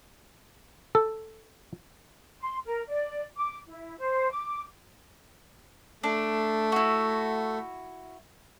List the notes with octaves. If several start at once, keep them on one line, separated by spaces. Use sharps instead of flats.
A4
C6
A#4
D5
D6
E4
C5
D6
A3 D4
E4 F#4